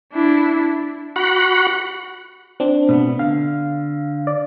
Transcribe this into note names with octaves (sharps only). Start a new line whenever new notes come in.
D4 E4
F#4 F#5 B5
C4 D4
B2 A3 B3
D3 F5
D5